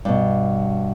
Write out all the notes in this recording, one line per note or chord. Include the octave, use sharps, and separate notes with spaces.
G2 B2